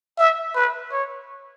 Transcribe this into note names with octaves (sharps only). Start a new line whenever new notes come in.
E5
B4
C#5